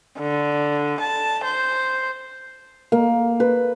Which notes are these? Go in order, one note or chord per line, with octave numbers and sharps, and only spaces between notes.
D3
A5
C5
A#3
B4